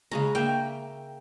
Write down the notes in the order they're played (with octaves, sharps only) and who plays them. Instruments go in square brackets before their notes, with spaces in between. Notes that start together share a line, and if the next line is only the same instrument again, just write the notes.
[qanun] C#3 G#3 C#4 [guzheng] A#5
[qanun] A#3 E5 [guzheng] G5